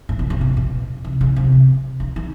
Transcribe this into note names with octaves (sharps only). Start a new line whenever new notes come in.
A2
B2
C3
B2
B2
C3
C#3
C3
D3
D#3